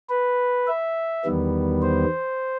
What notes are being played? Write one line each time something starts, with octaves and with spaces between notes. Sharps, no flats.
B4
E5
E2 D#3 G3 B3
C5